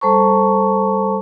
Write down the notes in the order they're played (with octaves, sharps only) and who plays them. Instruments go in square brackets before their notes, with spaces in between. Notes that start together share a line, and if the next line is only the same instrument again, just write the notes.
[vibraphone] G3 A4 C5 A5 A#5 C#6